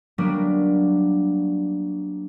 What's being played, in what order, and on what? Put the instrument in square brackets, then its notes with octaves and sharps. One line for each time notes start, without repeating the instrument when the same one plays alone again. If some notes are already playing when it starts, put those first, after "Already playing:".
[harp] F#3 G3 A#3 B3 D4